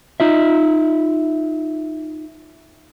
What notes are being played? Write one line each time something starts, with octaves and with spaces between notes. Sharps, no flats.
D#4 F4 E5